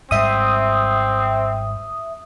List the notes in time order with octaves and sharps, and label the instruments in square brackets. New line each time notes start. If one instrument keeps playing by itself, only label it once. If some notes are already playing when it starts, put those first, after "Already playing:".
[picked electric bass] G#1 G#2 G3 [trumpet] C4 [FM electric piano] E5 D#6